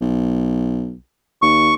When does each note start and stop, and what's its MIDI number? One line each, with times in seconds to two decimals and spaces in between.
0.01 0.95 35
1.42 1.75 39
1.42 1.74 85